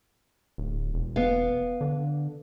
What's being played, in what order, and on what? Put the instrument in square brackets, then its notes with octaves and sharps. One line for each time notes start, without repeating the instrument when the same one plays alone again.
[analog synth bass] D1
E1
[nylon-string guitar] B3 F5
[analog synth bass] D3